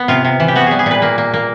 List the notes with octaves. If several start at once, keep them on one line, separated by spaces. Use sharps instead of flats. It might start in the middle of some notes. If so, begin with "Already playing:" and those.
Already playing: B3
C3 F4
C3
E3
G4
B3 F#4
G3 G#4
G#4
A#2 B4
A#3
A#3
A#3